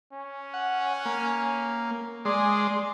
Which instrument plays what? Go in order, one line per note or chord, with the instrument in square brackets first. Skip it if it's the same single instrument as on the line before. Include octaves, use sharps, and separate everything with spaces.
[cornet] C#4
[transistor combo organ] F#5
A#3
[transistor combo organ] G#3 D5 C6 [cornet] G#4